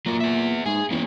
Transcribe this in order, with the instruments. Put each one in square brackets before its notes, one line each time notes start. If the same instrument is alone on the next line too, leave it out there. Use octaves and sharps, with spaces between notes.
[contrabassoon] A#2 [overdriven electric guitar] F#3 A#4
[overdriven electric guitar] B3 E5
[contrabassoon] G#2 [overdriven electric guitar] G#4
[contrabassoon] E2 [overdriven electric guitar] A#3 C#4